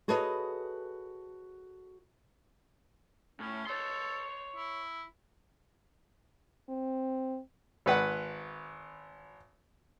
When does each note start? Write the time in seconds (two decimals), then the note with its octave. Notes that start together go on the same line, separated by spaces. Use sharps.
0.08 F#4 G#4 A4 B4 C#5 D#5
3.40 A2 C#4
3.66 A4 C#5 C6
4.56 E4
6.69 C4
7.86 G#1 B4 F#5